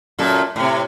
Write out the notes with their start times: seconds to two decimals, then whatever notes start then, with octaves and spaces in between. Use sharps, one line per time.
0.19 F#2 A#2 A4
0.56 A2 C3